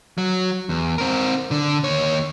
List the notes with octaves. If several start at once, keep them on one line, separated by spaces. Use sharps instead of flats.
F#3
E2
C4 A#4
D3
D#2 C#5